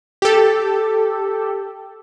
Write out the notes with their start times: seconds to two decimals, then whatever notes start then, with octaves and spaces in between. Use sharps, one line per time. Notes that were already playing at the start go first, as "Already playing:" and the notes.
0.22 G4 A4